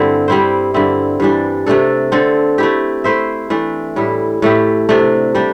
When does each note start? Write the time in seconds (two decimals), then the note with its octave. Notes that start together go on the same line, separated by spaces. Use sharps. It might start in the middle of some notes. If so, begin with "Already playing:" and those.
Already playing: G2 D3 A3 C4 E4
0.28 G3 C4 E4 C5
0.74 G2 D3 C4 E4
1.20 G2 E3 G3 D4
1.66 C3 A3 D4 A4
2.12 D3 C4 A4
2.58 A3 E4 G4
3.04 A3 E4 C5 E5
3.50 E3 A3 D4
3.96 A2 G3 E4
4.42 A2 A3 E4 G4
4.89 C3 A3 D4
5.35 G3 D4 G4